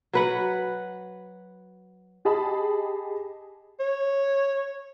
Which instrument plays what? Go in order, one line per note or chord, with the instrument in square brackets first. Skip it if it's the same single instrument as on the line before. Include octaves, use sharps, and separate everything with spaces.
[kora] F#3 B4 F#5
[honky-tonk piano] G4 G#4 D#5 A5 B5
[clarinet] C#5